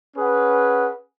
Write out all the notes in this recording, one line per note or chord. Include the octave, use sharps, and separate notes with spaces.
C#4 G#4 B4 F#5